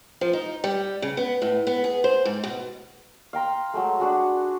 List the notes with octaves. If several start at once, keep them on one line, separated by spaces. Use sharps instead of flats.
F3
D#4
G3
C#3
B3
A2
B3
G#4
C5
G#2
B2
F5 G5 A#5 C6
F#3 G#3 A3
D4 F#4 G#4